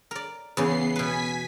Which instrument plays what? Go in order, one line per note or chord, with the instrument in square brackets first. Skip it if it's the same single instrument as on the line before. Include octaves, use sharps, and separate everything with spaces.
[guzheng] A#4 D5
[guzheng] E2 C#3 E3 [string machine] B3 C7
[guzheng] B2 B4 [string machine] G#5 B6